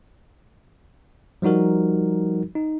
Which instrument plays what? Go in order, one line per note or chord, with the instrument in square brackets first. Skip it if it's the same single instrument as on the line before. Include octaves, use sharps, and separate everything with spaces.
[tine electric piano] F3 G3 D#4 F#4 A#4
D#4